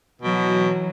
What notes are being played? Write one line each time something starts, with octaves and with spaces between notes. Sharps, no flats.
B2 E3 F#3